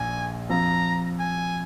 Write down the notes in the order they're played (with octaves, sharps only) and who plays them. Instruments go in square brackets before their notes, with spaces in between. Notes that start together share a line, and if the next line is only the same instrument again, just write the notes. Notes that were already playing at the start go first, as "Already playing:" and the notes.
Already playing: [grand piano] A#1 A#2 [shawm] G#5
[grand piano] F2 F3 [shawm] A#5
[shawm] G#5